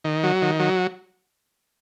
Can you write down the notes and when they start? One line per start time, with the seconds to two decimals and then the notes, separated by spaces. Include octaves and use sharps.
0.04 D#3
0.23 F#3
0.42 D#3
0.60 F#3